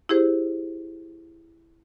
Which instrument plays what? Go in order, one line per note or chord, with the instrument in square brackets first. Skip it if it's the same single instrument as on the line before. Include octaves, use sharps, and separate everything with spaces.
[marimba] E4 G4 G#4 C5